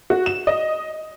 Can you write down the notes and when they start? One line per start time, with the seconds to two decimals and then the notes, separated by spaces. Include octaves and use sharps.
0.10 F#4
0.26 E7
0.47 D#5